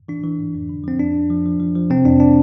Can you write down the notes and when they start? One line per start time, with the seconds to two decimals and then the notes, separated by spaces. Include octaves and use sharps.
0.08 E3 D4
0.23 E3
0.39 G#2
0.55 F2
0.69 D3
0.84 F3 C4
0.99 F2 D4
1.15 F2
1.30 F3
1.45 F3
1.60 F3
1.75 F3
1.90 C3 C4
2.05 F2 D4
2.20 D4